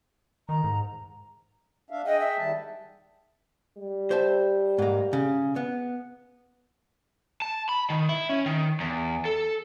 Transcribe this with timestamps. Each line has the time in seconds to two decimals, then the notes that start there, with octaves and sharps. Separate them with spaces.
0.49 D#3 A#5
0.64 G#2
1.91 D4 E5 F5
2.06 G#4 D#5 F#5 G5
2.20 E5
2.38 D#3 G3 A5
3.77 G3
4.11 C5 E5 A5
4.78 G#2 A#3
5.13 C#3
5.56 B3
7.42 A5
7.69 B5
7.90 D#3
8.09 E4
8.29 C#4
8.46 D#3
8.80 E2
9.25 A4